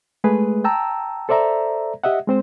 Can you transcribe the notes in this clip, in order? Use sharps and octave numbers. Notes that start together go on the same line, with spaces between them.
G#3 A3 G#4 B4
G5 A5 A#5 E6
A4 C5 D5 E5 A#5
G4 D#5 E5 F#5
G#3 C4 C5